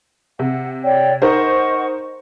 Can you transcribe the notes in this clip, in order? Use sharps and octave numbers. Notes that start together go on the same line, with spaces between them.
C3 F#5
C#5 D5 G5
D#4 A#4 C5 D#5 F#5 C#6